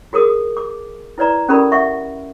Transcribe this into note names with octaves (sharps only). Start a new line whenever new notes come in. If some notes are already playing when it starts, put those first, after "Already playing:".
F#4 G#4 A#4 D#6
D6
E4 B4 D5 A#5
C#4 G4 A4 A#4 D5 B5
E5 F#5 C#6